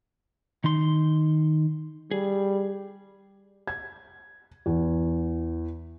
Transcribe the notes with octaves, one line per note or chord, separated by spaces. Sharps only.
D#3 D#4 C6
G3 G#4
G#6
E2